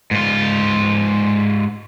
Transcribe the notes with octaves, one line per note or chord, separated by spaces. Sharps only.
G#2 F4